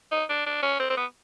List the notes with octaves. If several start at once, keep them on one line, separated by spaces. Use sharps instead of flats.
D#4
D4
D4
C#4
C4
C4
B3